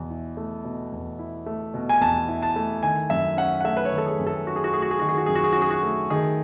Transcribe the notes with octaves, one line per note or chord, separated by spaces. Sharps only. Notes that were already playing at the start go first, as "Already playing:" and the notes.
Already playing: E2 B2
E4
A3
B2
E2
E4
A3
B2
G#5
E2 A5
E4
A5
A3
D#3 G#5
F#2 E5
C#4 F#5
F#5
A3 E5
B4
C#5
D#3
A4
G#4
F#2
A4
C#4 F#4
G#4
F#4
A3 G#4
F#4
G#4
D#3 F#4
G#4
F#4
F#2 G#4
F#4
G#4
C#4 F#4
G#4
F#4
A3
D#3 G#4